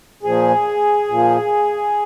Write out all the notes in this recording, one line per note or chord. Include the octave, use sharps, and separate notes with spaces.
A#2 F3 G#4
A#2 F3